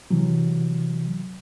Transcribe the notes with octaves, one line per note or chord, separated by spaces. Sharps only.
C3 E3 F#3